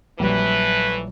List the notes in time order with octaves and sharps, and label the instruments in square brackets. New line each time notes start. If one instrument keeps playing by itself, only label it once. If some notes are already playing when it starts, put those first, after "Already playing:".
[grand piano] A#1 F#3 G3 [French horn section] E3 A3 B4